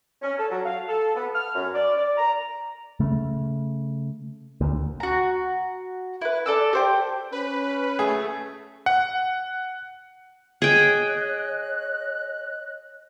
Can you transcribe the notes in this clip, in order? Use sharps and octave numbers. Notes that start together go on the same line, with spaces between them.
C#4
A4
F#3
F5
A4
B3
F6
F#2
D5
D5
A#5
C#3 A3
D2
F#4 A#5
E4 B4
A4 D5 E6
G4 C5 G5
C#4 B4
A3 G#4
F#5
G#4 C#5 D#5 G5 F#6